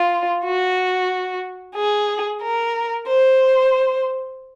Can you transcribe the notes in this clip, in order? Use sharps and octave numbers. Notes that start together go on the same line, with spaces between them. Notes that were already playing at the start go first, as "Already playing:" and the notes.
Already playing: F4
F#4
G#4
A#4
C5